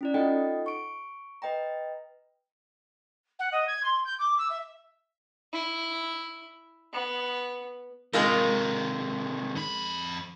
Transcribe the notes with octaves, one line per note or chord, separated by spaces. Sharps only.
C#4 E4 D5
D#4 F4 A4 D#5 F#5 G5
C#6 D7
B4 D#5 G5 A#5
F#5
D#5
G#6
C6
G6
D6
E6
E5
E4
B3
C3 D#3 G#3 F4 A#4
F2 B5